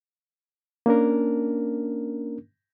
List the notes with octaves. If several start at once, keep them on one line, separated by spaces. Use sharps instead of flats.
A#3 C#4 D4 A#4